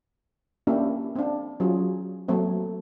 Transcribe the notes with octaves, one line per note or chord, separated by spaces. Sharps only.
A#3 C#4 D4 E4 G4
C4 D4
F#3 C#4 F4 G#4
F#3 A3 A#3 C4